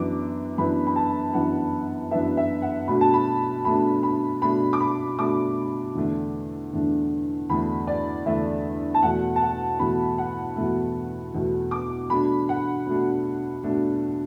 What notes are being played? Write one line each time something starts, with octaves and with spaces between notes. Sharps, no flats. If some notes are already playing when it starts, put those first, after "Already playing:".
Already playing: F#2 E3 B3 D4 D6
F#2 E3 B3 D4 B5
B5
A5
F#2 E3 B3 D4 F#5
F#2 E3 B3 D4 E5
E5
F#5
B2 A3 D4 B5
A5
B5
B2 A3 D4 B5
B5
B2 A3 D4 B5
D6
B5
B2 A3 D4 D6
E2 D3 A3 D4
E2 D3 A3 D4
E2 D3 A3 D4 B5
D5
E2 D3 A3 D4 E5
A5
E2 B2 A3 F#5
A5
F#5
E2 B2 A3 B5
F#5
E2 B2 A3
E2 B2 A3
D6
B2 A3 D4 B5
F#5
B2 A3 D4
B2 A3 D4